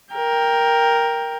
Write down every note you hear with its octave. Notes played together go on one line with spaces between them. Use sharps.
A#4 G5